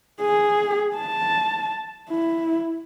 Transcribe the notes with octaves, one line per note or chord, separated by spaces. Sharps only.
G#4
A5
E4